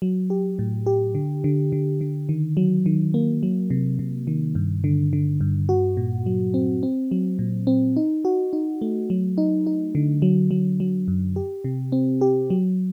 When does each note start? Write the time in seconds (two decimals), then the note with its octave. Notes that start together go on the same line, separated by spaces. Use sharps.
0.02 F#3
0.30 G4
0.59 A2
0.86 G4
1.15 D3
1.44 D3
1.72 D3
2.01 D3
2.29 D#3
2.57 F#3
2.86 D#3
3.14 A#3
3.43 F#3
3.70 C3
3.99 C3
4.27 D#3
4.55 G2
4.84 D3
5.13 D3
5.41 G2
5.69 F#4
5.97 A#2
6.26 F#3
6.54 C4
6.83 C4
7.11 F#3
7.39 A#2
7.67 C4
7.96 D#4
8.25 F#4
8.53 D#4
8.82 A3
9.10 F#3
9.38 D#4
9.66 D#4
9.95 D3
10.22 F#3
10.51 F#3
10.80 F#3
11.08 F#2
11.36 G4
11.64 C3
11.92 C4
12.21 G4
12.50 F#3